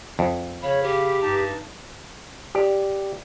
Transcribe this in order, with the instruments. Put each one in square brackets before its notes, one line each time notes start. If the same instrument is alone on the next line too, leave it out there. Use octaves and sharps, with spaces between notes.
[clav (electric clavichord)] F2
[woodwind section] C#3 F5 B5 [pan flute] C#5
[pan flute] G4
[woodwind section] G2 D#4 A5
[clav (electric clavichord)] G4 D5